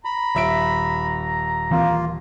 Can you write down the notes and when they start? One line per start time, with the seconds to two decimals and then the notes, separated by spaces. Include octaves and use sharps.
0.05 A#5 B5
0.35 D#1 E5 D7
1.71 E3 A#3 C4 F4